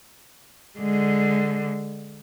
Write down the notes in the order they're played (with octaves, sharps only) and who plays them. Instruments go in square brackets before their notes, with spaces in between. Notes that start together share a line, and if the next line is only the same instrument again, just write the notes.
[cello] D3 G#3